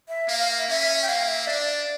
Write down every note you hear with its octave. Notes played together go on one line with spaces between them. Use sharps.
E5
A#3 F5
F5
E5
C#4 E5
G5
A#3 F5
E5
D4 D5